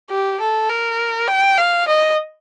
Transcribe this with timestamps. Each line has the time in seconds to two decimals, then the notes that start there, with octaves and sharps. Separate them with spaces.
0.11 G4
0.40 A4
0.69 A#4
1.28 G5
1.58 F5
1.88 D#5